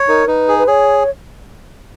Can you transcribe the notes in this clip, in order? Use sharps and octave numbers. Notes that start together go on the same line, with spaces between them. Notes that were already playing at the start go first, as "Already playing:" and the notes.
Already playing: C#5
D#4 A#4
D#4 B4
G#4
B4
G#4 C#5